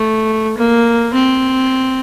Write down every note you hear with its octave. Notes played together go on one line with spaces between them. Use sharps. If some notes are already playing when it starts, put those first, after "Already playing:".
Already playing: A3
A#3
C4